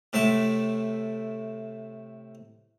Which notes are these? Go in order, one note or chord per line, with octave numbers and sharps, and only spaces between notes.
A2 C3 A3 E5 A5